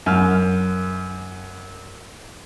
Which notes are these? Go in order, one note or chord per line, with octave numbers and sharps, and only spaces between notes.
F#2 F6